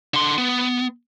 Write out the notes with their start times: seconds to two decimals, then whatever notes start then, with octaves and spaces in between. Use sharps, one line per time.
0.14 D3 C6
0.38 B3